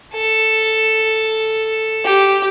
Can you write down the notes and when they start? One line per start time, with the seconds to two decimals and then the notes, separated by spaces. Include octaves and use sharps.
0.14 A4
2.04 G4